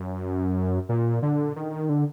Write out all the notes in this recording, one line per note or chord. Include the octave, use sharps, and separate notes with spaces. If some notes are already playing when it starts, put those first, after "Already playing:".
Already playing: F#2
A#2
D3
D#3
D3